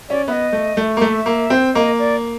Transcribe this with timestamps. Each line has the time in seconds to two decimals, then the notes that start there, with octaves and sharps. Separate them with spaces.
0.09 C#4 D5
0.28 B3 D#5 E5
0.52 A3
0.77 A3
0.97 A#3
1.01 A3 E5
1.26 A#3
1.50 C4
1.75 A#3 D#5
1.99 D5